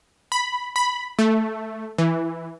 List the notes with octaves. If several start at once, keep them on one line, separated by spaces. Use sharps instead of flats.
B5
B5
A3
E3